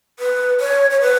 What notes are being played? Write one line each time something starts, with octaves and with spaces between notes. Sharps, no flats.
B4
C#5
C#5
B4